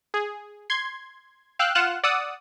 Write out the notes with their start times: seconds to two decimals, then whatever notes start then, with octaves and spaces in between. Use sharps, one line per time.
0.14 G#4
0.70 C6 G#6
1.59 F5 G5 E6 F#6
1.75 F4 F#5 F6 F#6 E7
2.03 D5 F#5 D#6 E6